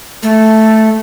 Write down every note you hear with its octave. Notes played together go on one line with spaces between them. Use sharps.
A3